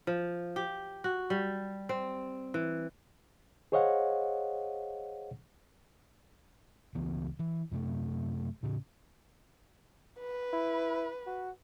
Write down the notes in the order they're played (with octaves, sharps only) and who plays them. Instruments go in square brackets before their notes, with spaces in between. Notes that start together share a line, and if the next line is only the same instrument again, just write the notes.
[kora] F3
G4
F#4
G3
C4
E3
[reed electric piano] G#4 C5 C#5 D#5 F5 F#5
[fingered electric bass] C#2 E3 B3
E3
F#2 C3 A3
A2 C#3
[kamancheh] B4
[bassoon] E4
F#4